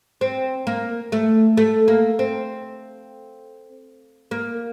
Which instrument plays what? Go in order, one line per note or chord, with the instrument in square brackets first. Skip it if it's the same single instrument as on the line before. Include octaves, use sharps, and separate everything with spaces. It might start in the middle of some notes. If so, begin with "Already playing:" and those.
[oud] C4
A#3
A3
A3
A#3
C4
A#3